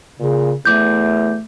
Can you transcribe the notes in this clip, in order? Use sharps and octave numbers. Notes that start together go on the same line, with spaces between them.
A#2 C#3
E2 A3 D6 G6